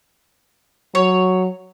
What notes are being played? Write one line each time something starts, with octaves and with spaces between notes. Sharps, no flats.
F#3 C#5